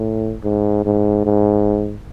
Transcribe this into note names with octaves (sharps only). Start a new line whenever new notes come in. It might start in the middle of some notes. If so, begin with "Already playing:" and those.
Already playing: A2
G#2
G#2
G#2